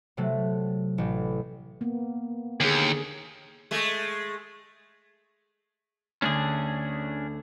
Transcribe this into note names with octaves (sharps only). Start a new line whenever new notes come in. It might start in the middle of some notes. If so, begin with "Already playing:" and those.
C3 F#3 A3
A1
A#3 B3
D#2 D3 G#4
G#3 A3
D2 D3 C#4 D4 G#4